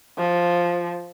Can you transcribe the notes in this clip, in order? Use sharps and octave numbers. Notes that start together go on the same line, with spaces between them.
F3